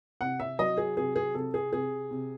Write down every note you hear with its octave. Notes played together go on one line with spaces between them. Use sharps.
C3 F#5
E5
F#3 D#5
G#4
C3 G#4
G#4
C3 A4
G#4
C3 G#4
C3